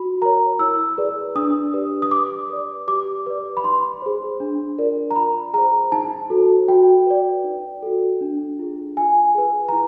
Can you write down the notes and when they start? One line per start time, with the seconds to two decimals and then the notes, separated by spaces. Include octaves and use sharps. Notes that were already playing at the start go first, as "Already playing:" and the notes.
Already playing: F#4 B5
0.22 A#4 C#5 A#5
0.59 E4 E6
0.98 G#4 B4 D5
1.35 D4 D#6
1.74 G4 B4 D5
2.02 D#6
2.11 G4 D6
2.50 B4 D5
2.88 G4 D6
3.26 B4 D5
3.57 B5
3.64 D#4 C6
4.02 G#4 C5
4.40 D4
4.78 F4 A#4 D5
5.11 A#5
5.16 F4 B5
5.54 G#4 C5 A#5
5.92 D#4 A5
6.30 F#4 A4 C5
6.68 F#4 G5
7.06 B4 D5
7.44 D#4
7.83 F#4 A4
8.21 D4
8.59 F4 G#4
8.97 F4 G#5
9.35 G#4 B4
9.69 A#5
9.72 E4